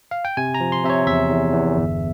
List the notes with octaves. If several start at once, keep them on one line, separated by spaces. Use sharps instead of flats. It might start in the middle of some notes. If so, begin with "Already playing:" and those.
F5
G5
C3 G#5
A#5
F3
C6
C3 E5
C#5
E2 E5
E2
E2
G1